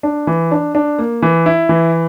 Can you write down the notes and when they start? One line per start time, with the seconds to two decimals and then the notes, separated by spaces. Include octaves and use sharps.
0.03 D4
0.27 E3
0.51 D4
0.75 D4
0.99 A#3
1.22 E3
1.46 E4
1.69 E3